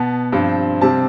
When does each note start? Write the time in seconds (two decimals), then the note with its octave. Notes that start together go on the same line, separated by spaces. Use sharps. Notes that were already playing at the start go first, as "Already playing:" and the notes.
Already playing: B2 B3 A5
0.33 G2 F3 C4
0.81 C3 G3 C4 A5